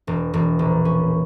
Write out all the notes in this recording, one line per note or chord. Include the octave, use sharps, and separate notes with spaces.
E1
E1
A#1
C#4